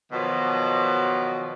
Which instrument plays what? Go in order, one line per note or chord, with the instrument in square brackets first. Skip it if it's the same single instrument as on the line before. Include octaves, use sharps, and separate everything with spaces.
[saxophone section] B2 D#3 F3 F#3 F#4